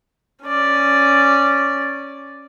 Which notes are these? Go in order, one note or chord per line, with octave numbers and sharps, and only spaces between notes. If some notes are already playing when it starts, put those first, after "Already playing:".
C#4 D5